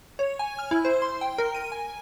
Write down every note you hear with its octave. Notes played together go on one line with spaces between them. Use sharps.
C#5
G#5
F6
E4
C5
C6
G5
A#4
D#7
G#5